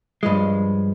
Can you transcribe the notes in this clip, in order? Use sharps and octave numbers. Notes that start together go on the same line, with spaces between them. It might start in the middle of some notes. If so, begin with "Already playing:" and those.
G2 F3 G#3